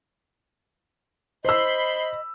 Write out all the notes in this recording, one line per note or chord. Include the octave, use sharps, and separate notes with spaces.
C5 D#5 B5 E6 G6 C7